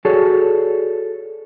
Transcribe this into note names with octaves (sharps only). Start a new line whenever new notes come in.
F#4 G#4 A4 C#5 D5